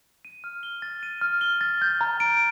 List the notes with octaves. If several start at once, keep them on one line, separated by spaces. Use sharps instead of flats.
D#7
F6
G7
A6
D#7
F6
G7
A6
G6
A#5
D7